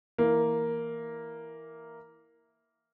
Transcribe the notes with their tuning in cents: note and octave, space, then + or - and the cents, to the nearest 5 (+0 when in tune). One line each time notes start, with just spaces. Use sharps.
E3 -10 A#3 +0